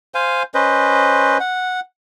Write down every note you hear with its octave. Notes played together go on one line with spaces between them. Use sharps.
C5 F5 G#5
C#4 B4 C5 D#5
F#5